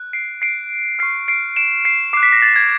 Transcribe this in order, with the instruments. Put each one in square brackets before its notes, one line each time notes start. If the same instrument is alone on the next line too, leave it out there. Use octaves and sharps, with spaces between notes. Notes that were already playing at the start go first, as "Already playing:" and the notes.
Already playing: [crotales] F#6
C7 D7
C7 D7
C#6 F6 C7
C7 D7
D7 E7
C7 D7
D6 F#6 C7
B6
A#6
A6
G#6